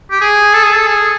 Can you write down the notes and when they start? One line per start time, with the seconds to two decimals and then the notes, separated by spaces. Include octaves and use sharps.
0.11 G4
0.21 G#4
0.53 A4
0.63 G#4
0.72 A4
0.86 G#4